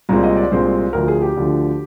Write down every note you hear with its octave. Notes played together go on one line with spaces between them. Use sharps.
C2 A#2 G#3 C4 A#5
D#5
D5
C2 A#2 G#3 C4 C5
D2 D3 F3 A#4
G#4
G4
D2 D3 F3